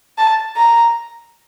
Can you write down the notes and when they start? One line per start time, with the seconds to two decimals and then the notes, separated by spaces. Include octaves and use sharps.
0.18 A5
0.56 A#5